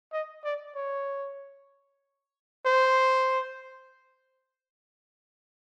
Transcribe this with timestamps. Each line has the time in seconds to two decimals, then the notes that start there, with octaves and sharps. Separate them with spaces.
0.13 D#5
0.44 D5
0.76 C#5
2.66 C5